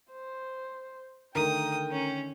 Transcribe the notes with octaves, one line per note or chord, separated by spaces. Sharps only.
C5
D3 D#3 A3 A#4 G5 D#6
C#4